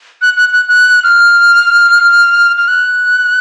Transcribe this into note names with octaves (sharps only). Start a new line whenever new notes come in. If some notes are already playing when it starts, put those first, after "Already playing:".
F#6
F#6
F#6
F#6
F6
F6
F#6